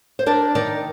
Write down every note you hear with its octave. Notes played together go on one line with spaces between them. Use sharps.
C5
D4 A#4 D5
D#3 A#4 D5